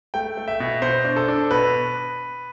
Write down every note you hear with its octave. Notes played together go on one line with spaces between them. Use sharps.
A3 G5
A3
E5
B2
B2 C5
D4
A4
D4
B2 B4